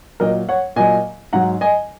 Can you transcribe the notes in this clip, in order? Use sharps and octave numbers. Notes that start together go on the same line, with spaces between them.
A#2 F#3 A#4 D#5
C#5 F#5
A#2 F#3 D#5 G#5
G#2 F#3 F#5 A#5
D#5 G#5